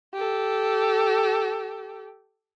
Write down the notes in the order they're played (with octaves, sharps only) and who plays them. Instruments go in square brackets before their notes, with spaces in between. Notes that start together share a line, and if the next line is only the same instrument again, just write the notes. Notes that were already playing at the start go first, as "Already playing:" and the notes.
[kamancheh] G4 A4